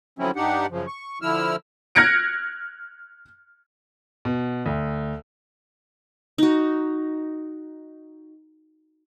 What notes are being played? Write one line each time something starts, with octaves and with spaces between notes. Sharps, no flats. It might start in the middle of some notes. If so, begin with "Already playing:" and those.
D3 F3 F#3 C4 C#4 E4
G2 D4 D#4 G4 F#5
F#2 C#3 F3
C#6
D3 F3 E4 E6 F6
F6 F#6 G#6 A#6 C#7 D7
B2
D2
D#4 F#4